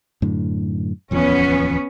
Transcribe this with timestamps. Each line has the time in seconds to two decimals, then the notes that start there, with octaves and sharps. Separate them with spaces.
0.22 F#2 A2 D3
1.11 D1 E2 F3 B3 C#4